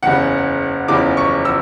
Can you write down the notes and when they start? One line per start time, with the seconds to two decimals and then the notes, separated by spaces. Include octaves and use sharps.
0.03 F#1 E2 C#3 F#5
0.88 F#1 E2 C#3 D6
1.17 C#6
1.45 E6